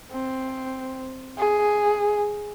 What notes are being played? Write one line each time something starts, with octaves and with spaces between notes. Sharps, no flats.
C4
G#4